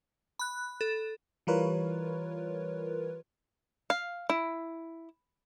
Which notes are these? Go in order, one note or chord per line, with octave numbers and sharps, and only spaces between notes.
B5 F#6
A4
E3 G3 F4 A#4 B4 C#5
F5
E4